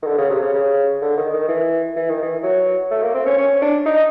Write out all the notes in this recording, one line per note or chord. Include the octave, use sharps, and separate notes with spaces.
D#3
D3
C#3
C3
C#3
C#3
D3
D#3
D#3
E3
E3
D#3
E3
F#3
A3
A#3
C4
C#4
C#4
D4
D#4